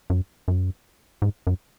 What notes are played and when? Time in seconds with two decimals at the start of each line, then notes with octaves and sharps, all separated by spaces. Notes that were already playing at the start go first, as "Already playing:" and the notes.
0.10 F#2
0.48 F#2
1.22 G#2
1.47 F#2